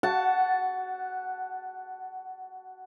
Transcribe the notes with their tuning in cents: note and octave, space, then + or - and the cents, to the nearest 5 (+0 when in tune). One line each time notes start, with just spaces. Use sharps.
F#4 +20 F#5 +0 A5 +0